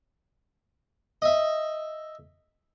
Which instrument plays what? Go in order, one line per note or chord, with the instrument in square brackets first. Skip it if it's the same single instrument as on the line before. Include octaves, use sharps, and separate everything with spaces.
[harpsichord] D#5 E5